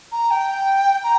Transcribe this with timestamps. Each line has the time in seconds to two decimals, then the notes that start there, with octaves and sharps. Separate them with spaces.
0.12 A#5
0.31 G5
1.03 A#5